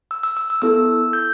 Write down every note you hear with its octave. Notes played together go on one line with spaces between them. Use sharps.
E6
E6
E6
E6
B3 E4 A4 E6
G6